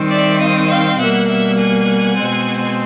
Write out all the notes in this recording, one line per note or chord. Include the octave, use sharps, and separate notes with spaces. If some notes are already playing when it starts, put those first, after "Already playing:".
Already playing: D#3 G3 C4
D5 E5
D#5 F5
F5 G5
B2 G3 A#3 E5 F#5
E5 F#5
F#5 G#5
B2 G#3 C4